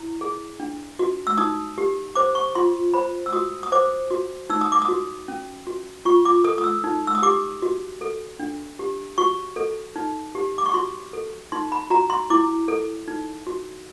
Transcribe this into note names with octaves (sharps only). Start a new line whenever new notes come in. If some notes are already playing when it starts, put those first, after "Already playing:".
Already playing: E4
G#4
D4
F#4
E6
D#4 D#6
G4
C5 D6
C#6
F4 C6
C5 B5
E6
F#4 D#6
D#6
C5 D6
F#4
D#4 E6
D#6
D6
D#6
F#4
C#4
F#4
F4 C#6
D6
A4 D#6
D#6
E6
D#4
E6
D#6
G4 D6
F#4
A4
D4
G4
F#4 C#6
A4
D#4
G4
D6
C#6
F#4 C6
A4
D#4 C6
B5
F#4 A#5
C6
E4 D6
A4
D#4
F#4